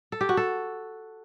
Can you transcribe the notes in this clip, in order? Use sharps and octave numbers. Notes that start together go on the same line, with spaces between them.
A4
G4
F#4
A4